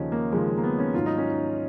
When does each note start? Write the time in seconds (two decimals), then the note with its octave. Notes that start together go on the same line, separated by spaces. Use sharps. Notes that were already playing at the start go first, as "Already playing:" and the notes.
Already playing: D#2 C#3 F3 C#4 D#4
0.12 A#3
0.32 D#2 C#3 F3 G#3
0.58 A#3
0.63 B3
0.78 C#4
0.93 G#2 D#3 F#3 F4
1.06 D#4
1.18 C#4
1.30 D#4